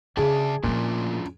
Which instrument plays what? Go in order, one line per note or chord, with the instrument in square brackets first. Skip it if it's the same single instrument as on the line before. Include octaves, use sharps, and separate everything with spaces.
[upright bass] C#3 [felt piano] G#4 [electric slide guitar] D5 E5 A5
[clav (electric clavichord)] A#2 [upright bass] F3 A3 [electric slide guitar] C#4 D4 F4